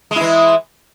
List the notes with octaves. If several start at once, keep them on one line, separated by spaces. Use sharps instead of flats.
E3 G#3 E4